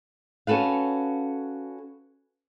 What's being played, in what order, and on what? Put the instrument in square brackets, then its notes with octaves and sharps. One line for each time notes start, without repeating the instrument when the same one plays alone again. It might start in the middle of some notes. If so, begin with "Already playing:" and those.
[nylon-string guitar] C#4 F#4 A4 B4 F5